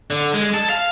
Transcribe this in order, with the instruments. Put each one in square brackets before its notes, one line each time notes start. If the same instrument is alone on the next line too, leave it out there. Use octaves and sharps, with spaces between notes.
[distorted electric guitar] D3
G#3
A4
F5